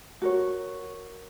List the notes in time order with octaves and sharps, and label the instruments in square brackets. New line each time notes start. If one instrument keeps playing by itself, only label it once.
[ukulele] F#4 A#4 C#5